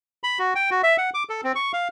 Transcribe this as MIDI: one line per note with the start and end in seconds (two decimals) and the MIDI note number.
0.24 0.39 83
0.39 0.54 66
0.55 0.70 79
0.71 0.82 66
0.83 0.97 76
0.98 1.10 78
1.14 1.23 86
1.29 1.41 69
1.44 1.52 60
1.55 1.72 85
1.73 1.88 77